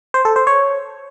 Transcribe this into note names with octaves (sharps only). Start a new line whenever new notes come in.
C5
A4
C5
C#5